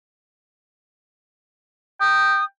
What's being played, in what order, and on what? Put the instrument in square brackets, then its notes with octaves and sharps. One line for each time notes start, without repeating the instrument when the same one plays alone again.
[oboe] G5 [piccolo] D#6